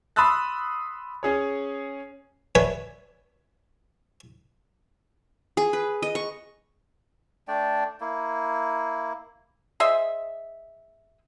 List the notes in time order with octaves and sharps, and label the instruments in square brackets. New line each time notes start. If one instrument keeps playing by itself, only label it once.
[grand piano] B5 C6 D#6 E6 F#6 A6
C#4 G#4 C#5
[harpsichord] D4 B4 C#5 E5 F#5 G#5
[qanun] G#4
B4
D#5
C#6
[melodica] A3 D4 D5 G5
A#3 E4
[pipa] G#4 C5 D#5 E5